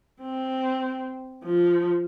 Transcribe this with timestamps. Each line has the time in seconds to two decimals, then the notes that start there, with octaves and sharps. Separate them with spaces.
0.21 C4
1.43 F3